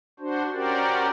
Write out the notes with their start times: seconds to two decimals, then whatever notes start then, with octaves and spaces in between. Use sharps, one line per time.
0.20 D4 F#4 C5
0.52 C#4 F#4 G4 A#4 C5 D5